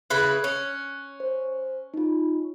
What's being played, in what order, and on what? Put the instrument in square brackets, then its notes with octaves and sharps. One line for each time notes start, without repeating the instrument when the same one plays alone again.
[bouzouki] C#3 E4 B4 [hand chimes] F#6 G#6
[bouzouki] C#4
[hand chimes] C5
D#4 F4